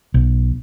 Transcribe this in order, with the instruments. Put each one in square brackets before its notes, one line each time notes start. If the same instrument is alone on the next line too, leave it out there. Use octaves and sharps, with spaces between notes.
[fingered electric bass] B1